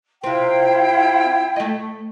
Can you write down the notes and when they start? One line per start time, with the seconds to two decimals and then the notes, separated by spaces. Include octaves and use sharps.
0.24 C3 C4 E4 F4 G5
1.56 A3 D#5